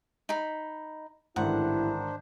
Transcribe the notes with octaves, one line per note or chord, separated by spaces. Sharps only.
D#4 B5
A1 G#2 D3 D#3 D4 E4 C5 F#5